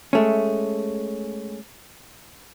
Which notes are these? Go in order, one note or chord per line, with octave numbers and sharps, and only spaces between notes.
G#3 A3 C#4